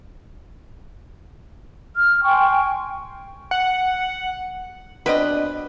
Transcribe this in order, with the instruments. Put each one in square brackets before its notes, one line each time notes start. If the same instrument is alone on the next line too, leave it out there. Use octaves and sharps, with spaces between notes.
[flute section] F6
G5 G#5 C6 C#6
[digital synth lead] F#5
[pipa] B2 C4 D#5 [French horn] D4 [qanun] B4